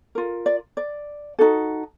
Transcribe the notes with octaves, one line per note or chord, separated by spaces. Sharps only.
F4 A#4
D5
D5
D#4 F#4 A4